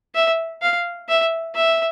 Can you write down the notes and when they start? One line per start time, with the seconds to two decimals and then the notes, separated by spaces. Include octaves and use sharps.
0.15 E5
0.61 F5
1.08 E5
1.55 E5